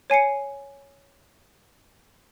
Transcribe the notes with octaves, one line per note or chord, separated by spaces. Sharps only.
C#5 G#5 C7 C#7